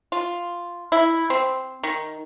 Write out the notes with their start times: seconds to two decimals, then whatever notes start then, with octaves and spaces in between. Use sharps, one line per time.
0.12 F4
0.92 E4
1.30 C4
1.83 D#3